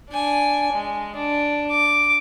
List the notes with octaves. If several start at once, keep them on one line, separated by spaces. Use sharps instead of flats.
D4 G#5
G#3
D4
D6